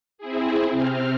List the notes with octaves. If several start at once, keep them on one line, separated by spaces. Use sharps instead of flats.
C4 E4 G#4
C3 C4 F6